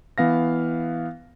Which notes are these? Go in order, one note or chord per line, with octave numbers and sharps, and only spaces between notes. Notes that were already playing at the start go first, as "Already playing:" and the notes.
E3 B3 F5 A#6